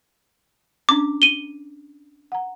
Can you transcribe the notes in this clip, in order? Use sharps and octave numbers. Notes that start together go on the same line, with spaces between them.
C#4 D4 D6
D#7 G7
F#5 A#5